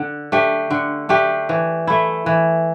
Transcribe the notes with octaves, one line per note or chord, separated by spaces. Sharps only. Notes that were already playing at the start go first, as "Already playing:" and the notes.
Already playing: D3
A3 D4 G4
D3
A3 D4 G4
E3
A3 E4
E3